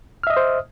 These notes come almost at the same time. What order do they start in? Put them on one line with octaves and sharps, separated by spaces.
F6 E5 D#5 D#6 C5